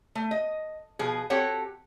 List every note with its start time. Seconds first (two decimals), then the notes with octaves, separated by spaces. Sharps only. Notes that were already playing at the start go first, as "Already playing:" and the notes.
0.15 A3
0.31 D#5
0.99 B2 F3 G#4
1.30 C4 F#4 G4 A4 C#5 F#5